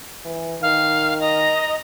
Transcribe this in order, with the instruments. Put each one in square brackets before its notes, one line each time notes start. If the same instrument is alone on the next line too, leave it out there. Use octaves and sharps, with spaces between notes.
[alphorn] E3
[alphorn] D#3 [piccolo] F5
[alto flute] D#5 [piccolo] A#5